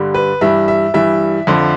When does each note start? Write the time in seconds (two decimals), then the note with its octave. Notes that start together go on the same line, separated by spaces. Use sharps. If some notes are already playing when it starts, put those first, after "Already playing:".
Already playing: G2 D3 G3
0.14 B4
0.41 G2 E3 G3 E5
0.68 E5
0.94 G2 E3 G3 E5
1.47 F2 D3 F3